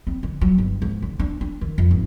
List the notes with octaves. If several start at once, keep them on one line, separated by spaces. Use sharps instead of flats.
C4
D3
F#3
G1
G#2
D3
D4
D4
D#3
F2
G#1